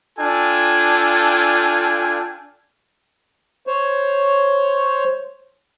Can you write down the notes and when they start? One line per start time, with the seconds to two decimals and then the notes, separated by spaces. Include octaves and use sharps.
0.19 D4 F4 A4 G5 G#5
3.67 C5 C#5